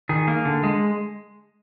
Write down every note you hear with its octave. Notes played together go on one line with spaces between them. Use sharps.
D#3 G#4
A#3
D3
G#3